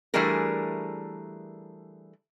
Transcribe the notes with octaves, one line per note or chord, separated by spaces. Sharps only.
E3 G3 A3 D4 G#4 A#4